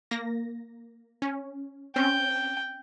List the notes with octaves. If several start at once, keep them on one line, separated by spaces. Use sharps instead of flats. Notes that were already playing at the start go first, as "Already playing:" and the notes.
A#3 A#6
C#4
C4 C#4 G5